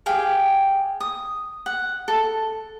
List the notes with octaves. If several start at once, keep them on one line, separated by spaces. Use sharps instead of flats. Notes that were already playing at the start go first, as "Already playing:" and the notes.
G4 G#4 F5 G5
D#6
F#5
A4